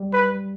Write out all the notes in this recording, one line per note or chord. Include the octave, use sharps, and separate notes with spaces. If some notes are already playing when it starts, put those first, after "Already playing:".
Already playing: G3
B4